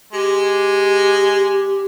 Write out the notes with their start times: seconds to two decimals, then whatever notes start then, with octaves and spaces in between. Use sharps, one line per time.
0.13 G#3 G4